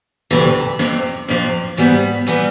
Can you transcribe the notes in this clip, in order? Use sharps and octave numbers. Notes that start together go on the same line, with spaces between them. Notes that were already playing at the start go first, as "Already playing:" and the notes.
D2 C3 E3
F2 C3 F3
F2 C3 F3
G#2 E3 G3 B3
E3 G3 B3